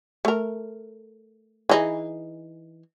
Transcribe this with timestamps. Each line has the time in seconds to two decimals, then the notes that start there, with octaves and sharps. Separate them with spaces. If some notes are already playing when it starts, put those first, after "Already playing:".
0.25 A3 A#4
1.69 E3 D#4 G#4